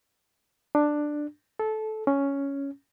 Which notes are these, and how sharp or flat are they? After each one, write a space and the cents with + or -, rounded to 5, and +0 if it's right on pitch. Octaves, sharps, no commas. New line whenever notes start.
D4 +10
A4 -20
C#4 +5